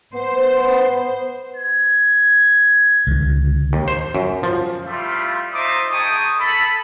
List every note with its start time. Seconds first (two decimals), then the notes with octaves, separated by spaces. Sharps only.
0.14 B3 C5
1.56 G#6
3.07 C#2 D3
3.73 D#2
3.88 C5
4.15 F#2
4.43 F3
4.87 G3 A3 E4 F4
5.53 D#4 F4 C5 E5 D6 D#6
5.91 D#4 G#4 G5 A5 C#6 D#6
6.39 A4 B5